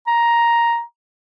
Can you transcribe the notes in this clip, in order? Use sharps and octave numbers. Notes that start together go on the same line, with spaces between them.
A#5